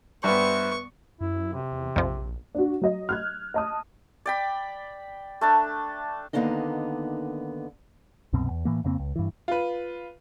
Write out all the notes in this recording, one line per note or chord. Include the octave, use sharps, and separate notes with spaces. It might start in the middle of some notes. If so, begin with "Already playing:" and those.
G2 B3 B4 C5 E5 C#6
F#2 E4
C3
E2
A#1 F2 F3
D4 F#4
F#3 D#5
F6 F#6 G#6
D#5 A5 D#6
D5 G5 B5
A3 D4 A5
D3 D#3 A#3 B3 D4 D#4
C2 F#2 B2 C4
E2
A2 E3 A#3
F2 C#3 A#3 C4
C#2
G2 E3
F4 B4